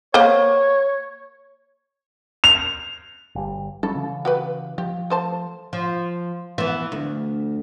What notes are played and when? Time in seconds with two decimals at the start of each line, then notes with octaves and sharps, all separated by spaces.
0.14 A#3 C5 C#5
2.44 F7
3.35 G1 G3
3.83 F#3 G3 C#4 A4
3.95 C#3 E3
4.25 F#4 G4 B4
4.78 F3 G4
5.10 A3 C5 A5
5.73 F3
6.58 E3 B3
6.92 D2